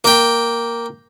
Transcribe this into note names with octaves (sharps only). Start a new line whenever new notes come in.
A#3 G5